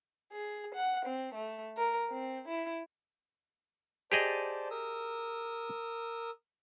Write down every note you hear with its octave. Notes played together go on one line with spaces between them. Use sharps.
G#4
F#5
C4
A3
A#4
C4
E4
G4 G#4 C5 D5 D#5 A5
A#4 D#6 E6